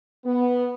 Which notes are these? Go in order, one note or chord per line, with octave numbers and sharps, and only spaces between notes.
B3